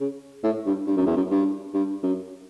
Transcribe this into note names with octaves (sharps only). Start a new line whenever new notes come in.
C#3
A2
G2
G2
F#2
E2
F#2
G2
G2
F#2